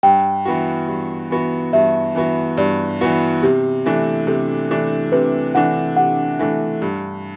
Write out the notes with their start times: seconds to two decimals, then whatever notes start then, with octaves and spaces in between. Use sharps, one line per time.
0.03 G2 G5
0.45 E3 B3 F#4
0.88 G2
1.30 E3 B3 F#4
1.73 G2 E5
2.15 E3 B3 F#4
2.58 G2 D5
3.01 E3 B3 F#4
3.43 C3 G4
3.86 E3 A3 D4
4.27 C3 A4
4.71 E3 A3 D4
5.12 C3 B4
5.55 E3 A3 D4 F#5
5.96 C3 F#5
6.39 E3 A3 D4
6.82 G2